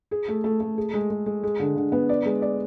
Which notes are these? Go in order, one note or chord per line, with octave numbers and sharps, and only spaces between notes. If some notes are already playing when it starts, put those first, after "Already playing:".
G#4
A3
A3
A3
G#4
G#3
G#3
G#3
G#3
D3
D3
B3
D5
G#3
D5